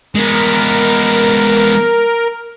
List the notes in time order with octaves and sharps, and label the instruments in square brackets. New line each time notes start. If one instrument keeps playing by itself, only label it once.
[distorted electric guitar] G#3 B3 [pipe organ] A#4